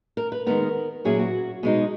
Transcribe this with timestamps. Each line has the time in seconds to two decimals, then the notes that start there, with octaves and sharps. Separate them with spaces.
0.17 A#4
0.32 B4
0.47 D#3 G#3 B3 A#4
1.05 A#2 F#3 C#4 E4 G#4
1.19 F#4
1.63 B2 G#3 D#4 G#4